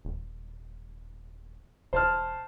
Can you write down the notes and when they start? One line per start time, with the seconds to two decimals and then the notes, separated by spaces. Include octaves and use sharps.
0.05 D#1
1.93 E1 C5 A5 F6